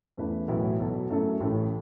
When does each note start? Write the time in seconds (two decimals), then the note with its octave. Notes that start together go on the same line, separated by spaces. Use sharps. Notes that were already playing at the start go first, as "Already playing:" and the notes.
0.17 E2 C#3 A3 E4 B4
0.48 B1 A2 E3 B3 E4
0.79 B1 B2 B3 A4
1.10 F#2 C#3 A3 E4 A4
1.40 A1 A2 A3